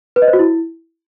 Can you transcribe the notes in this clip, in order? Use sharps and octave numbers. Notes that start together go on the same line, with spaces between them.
B4
D#5
C5
F#4
E4